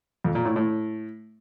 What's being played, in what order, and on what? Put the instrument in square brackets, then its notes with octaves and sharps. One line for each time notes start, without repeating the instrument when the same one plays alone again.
[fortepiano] F2
A#2
A2
A2